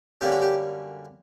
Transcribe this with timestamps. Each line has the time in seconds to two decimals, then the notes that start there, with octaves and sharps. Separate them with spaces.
0.21 F#2 D3 G3 A#3 C#4 G4
0.31 F#4
0.42 G4